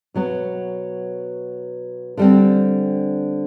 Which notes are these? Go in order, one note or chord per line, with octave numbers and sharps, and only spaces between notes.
B2 F#3 B3
D3 G3 C4